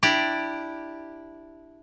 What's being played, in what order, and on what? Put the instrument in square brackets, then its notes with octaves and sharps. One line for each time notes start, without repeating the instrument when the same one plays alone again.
[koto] D4 E4 G4 D5